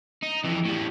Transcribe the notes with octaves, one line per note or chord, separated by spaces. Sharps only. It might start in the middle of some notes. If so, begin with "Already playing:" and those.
D#4
F2 E3
A2 G3